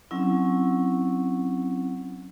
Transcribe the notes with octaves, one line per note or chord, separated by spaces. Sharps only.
F#3 C4 C#4 E4